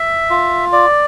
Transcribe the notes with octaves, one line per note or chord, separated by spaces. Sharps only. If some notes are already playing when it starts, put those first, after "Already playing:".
Already playing: E5
F4
D5